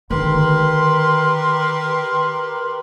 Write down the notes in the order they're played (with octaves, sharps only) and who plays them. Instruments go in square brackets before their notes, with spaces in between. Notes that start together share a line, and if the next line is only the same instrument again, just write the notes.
[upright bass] D3 D#3 [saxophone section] G4 A#4 B4 [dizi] C6